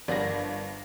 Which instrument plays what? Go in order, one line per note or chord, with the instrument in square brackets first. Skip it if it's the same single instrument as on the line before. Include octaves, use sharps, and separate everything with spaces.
[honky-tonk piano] G1 A#6 [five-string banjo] B3 A#4 D5